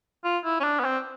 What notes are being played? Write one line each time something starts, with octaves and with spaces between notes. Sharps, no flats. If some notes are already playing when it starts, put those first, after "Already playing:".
F4
E4
C#4
D4
B3
C4